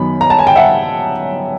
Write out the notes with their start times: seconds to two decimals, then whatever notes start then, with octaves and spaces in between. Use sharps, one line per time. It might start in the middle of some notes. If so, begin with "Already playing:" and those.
Already playing: F#2 D#3 F#3 B3 B5
0.21 A#5
0.30 A5
0.39 G#5
0.47 G5
0.56 E5 F#5